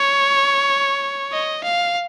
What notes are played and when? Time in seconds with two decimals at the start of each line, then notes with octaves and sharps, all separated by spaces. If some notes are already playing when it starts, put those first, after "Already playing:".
Already playing: C#5
1.32 D#5
1.64 F5